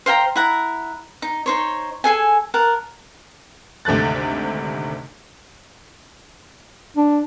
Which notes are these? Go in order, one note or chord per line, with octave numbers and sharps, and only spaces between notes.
C5 F5 G5 A#5
E4 F#5 A#5
D#4
D#4 C5 C#5
G#4 A4 G#5
A#4 F#5 A5
G#1 D2 C3 A3 F#6 A6
D4